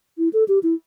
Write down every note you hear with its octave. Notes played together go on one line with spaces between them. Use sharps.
E4
A4
G4
E4